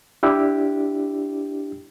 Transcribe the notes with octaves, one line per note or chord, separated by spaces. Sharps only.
D4 E4 G4